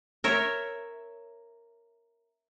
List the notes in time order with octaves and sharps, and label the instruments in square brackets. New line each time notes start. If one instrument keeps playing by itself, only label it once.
[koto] A#4 C#5 E5